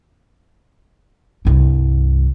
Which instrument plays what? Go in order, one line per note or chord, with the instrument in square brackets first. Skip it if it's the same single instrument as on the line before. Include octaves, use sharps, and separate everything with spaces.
[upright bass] C2 G2